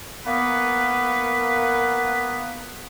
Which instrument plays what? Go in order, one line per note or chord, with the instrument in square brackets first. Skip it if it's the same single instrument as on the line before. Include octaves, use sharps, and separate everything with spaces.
[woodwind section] A#3 B3 B4